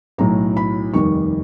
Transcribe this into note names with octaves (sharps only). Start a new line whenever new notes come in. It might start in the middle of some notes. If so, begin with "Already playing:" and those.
B1 A2 F#3 A3 A#5
B5
F1 D#2 D#3 G3 C#6